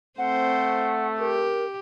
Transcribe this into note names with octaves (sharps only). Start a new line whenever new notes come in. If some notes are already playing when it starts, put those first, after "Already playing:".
A3 C4 C5 F#5
G4 A#4